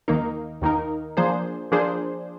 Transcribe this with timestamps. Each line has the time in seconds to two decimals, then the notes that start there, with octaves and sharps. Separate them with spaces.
0.08 D#2 D#3 A#3 D#4 A#4
0.62 D#2 D#3 A#3 D#4 A#4
1.17 F3 A#3 D4 G#4 C5
1.72 F3 A#3 D4 G#4 C5